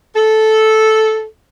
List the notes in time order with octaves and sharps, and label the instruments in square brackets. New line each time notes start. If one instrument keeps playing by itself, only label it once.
[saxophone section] A4